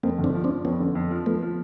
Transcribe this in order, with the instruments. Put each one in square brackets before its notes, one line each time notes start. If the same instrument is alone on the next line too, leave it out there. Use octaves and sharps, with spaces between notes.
[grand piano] F2 [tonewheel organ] A#3 C4
[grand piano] G1
[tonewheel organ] C4 D4
[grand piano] F3
[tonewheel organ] C4 D4
[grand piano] F3
[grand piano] F2 [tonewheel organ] B3 C#4
[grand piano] D3
F2
F3
[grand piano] F3 [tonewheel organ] A3 B3
[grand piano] F3